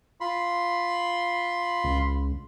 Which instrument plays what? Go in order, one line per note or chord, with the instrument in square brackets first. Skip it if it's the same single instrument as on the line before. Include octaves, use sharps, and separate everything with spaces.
[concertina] F4 B5 C6
[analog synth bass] C#2